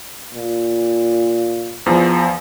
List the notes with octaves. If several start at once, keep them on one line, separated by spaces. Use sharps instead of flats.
A#2
E2 F3